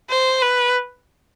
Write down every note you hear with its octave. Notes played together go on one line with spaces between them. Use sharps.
C5
B4